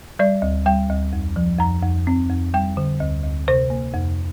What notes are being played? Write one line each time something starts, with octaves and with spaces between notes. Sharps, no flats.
G3 D5
D2
G3 G5
D2
F2
F3
F2 A#5
F2
C4
F2
G3 G5
D3
D2
D2
C3 C5
A#3
F2